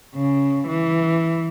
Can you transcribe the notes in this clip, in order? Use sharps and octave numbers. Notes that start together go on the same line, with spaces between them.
C#3
E3